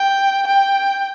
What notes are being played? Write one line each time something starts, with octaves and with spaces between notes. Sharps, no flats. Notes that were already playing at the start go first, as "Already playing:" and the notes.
Already playing: G5
G5